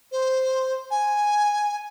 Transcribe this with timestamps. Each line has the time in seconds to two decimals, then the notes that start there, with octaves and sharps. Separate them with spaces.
0.12 C5
0.91 G#5